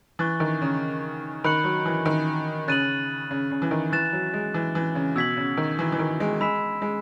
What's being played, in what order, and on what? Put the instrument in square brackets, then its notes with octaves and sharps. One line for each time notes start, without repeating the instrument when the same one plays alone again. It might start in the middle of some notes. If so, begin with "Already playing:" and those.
[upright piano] E3 [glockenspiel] C#6 F#6 A6
[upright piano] D#3
C#3
[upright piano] D#3 [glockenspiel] B5 F#6 C#7 F#7
[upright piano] F#3
E3
D#3
[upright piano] C#3 [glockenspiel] F#6 A6 D#7 F#7
[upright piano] C#3
C#3
E3
D#3
[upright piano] E3 [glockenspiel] F#6 A6 E7
[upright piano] F#3
G#3
E3
E3
C#3
[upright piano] B2 [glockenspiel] E6 G#6 B6 F#7
[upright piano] C#3
D#3
E3
E3
D#3
G#3
[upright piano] G#3 [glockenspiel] B5 E6 B6 E7
[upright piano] G#3